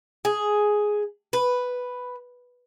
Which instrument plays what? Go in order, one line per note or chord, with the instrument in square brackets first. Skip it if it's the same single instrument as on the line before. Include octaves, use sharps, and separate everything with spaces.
[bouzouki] G#4
B4